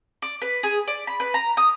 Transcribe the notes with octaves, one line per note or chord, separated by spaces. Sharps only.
D5
B4
G#4
D5
B5
B4
A#5
D#6